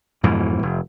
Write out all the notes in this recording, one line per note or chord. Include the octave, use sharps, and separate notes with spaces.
F2 G#2 B2 E3
F1